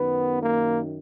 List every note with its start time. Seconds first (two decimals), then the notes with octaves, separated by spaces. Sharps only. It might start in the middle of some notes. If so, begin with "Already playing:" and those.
Already playing: F#2 D#3 B3
0.41 A#3